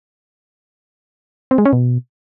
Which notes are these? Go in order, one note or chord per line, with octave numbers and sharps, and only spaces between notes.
C4
G#3
C#4
B2